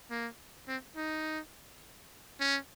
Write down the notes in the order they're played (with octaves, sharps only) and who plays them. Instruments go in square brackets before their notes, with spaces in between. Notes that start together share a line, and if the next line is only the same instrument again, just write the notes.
[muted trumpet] A#3
C4
D#4
C#4